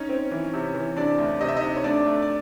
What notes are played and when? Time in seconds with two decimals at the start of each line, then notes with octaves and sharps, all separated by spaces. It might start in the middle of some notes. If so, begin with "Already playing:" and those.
Already playing: C#4 D#4 C#5
0.09 C4
0.31 E3
0.54 C3
0.74 E3
0.97 C3 D4 D5
1.18 D2
1.40 C3 D#5
1.48 E5
1.57 D#4 D#5
1.62 C3
1.77 C#5
1.84 A3 D4 D5
2.06 A3
2.22 D5